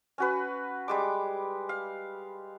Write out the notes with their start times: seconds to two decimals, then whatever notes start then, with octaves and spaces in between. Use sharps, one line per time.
0.18 C#4 F#4 B4
0.88 G3 G#3 D6
1.69 F5